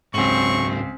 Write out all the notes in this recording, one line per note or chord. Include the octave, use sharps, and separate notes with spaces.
C#2 G#2 F#3 C4 C#6 F#7